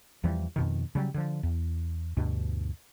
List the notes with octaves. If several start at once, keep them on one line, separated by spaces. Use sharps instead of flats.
E2 E3 F3 G3
F2 B2 D#3
C#3 F#3 G3
D3 F3
E2
D2 G2 B2